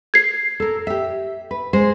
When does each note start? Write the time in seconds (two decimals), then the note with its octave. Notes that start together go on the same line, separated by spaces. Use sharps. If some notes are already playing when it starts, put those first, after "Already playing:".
0.14 G#6 C7
0.60 A4 A#4
0.87 G4 E5
1.51 B4
1.73 G#3 C5